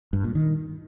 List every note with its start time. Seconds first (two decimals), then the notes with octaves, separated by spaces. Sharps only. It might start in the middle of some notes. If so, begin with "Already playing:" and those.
0.13 G2
0.24 A#2
0.35 D#3